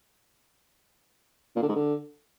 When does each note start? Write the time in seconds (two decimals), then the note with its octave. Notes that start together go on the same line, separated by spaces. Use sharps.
1.56 A#2
1.62 D3
1.69 G#2
1.75 D3